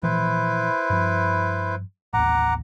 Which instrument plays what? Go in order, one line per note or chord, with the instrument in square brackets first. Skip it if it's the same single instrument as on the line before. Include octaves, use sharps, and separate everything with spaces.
[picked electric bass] A#2 E3 F3 [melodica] E4 B4 C5
[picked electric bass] G2 F3
[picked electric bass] A1 D#2 [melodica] F#5 A#5 D6